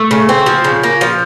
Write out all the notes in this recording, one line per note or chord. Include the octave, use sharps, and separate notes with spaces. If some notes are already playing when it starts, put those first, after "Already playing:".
Already playing: A3
C#3
C4
F3
C#3
A#3
F3